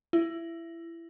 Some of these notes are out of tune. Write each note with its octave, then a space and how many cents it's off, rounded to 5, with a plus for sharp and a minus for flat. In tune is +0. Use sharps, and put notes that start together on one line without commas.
E4 +20